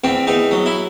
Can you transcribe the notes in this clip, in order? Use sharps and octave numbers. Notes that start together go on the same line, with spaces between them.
E2 C4
E2 D#4
F#3
E4